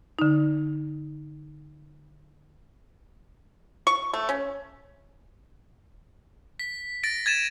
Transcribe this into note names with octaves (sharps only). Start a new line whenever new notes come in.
D3 D#4
C#6
A3
C#4
B6
A6 A#6 D7
G#6 A6 D#7 E7